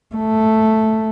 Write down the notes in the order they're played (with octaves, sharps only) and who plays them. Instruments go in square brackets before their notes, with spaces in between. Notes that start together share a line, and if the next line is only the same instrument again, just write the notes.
[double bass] A3